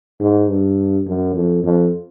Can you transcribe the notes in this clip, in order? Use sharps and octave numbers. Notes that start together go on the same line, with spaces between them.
G#2
G2
F#2
F2
F2